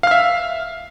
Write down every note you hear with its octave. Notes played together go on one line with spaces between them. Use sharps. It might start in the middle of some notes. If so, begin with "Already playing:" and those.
E5 F5 F6